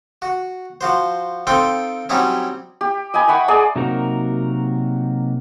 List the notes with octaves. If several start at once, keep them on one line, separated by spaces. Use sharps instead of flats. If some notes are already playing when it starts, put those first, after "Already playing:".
F#4
F3 F#4 C5
C4 D#4 F4 A4 C5 G5
F#3 G3 C4 C#4 D#4 E4
G4
D#5 G5 G#5 B5
E5 F#5 B5 C#6
G#4 D5 D#5 A#5
C3 F#3 A#3 D#4 F#4 A#4